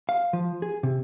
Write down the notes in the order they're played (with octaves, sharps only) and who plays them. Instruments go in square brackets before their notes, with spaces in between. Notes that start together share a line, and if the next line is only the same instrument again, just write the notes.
[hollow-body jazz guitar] F5
F3
G#4
C3